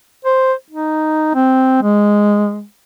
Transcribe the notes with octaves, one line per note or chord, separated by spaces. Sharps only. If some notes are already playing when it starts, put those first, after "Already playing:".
C5
D#4
C4
G#3